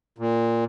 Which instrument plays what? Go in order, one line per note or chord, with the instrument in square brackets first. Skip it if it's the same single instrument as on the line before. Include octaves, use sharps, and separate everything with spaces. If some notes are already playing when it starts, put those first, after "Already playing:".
[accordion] A#2